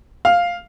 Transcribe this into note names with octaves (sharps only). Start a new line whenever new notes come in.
F5